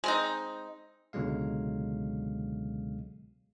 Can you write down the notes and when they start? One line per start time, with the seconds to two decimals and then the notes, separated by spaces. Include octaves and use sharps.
0.04 G#3 C4 D#4
1.13 C#2 B2 D3 F#3 G#3 F5